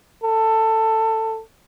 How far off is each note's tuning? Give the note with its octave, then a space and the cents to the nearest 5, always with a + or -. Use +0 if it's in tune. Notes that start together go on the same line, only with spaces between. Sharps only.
A4 +15